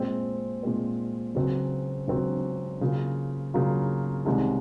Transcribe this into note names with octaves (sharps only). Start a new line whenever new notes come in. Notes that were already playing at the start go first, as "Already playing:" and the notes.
Already playing: A#2 G#3 C4
A#2 G#3 C4
C#2 C#3 F#3 C4 F#4
C#2 C#3 F#3 C4 F#4
C#3 F#3 A#3 F4
C#3 F#3 A#3 F4
C2 C3 D#3 G#3 C#4